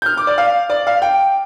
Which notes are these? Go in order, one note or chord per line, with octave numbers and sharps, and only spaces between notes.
G6
F6
D6
D5
F5
D5
F5
G5